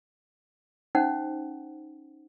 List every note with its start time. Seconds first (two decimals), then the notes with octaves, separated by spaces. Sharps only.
0.95 C#4 D#4 C5 F#5